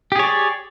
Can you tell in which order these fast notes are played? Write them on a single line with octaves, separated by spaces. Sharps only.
G4 G#4 C#5 D5